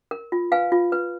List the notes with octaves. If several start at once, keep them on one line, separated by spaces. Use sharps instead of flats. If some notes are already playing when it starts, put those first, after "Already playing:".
A#4
F4
B4 F5 G#5
F4
B4